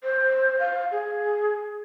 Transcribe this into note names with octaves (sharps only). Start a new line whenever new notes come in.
C5
F5
G#4